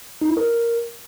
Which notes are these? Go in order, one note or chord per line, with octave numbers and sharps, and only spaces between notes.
D#4
E4
A#4